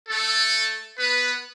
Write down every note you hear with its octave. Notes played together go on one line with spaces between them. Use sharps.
A3 A4
B3 B4